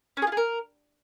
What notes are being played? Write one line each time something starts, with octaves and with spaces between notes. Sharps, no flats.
C#4
G#4
F4
G#4
A#4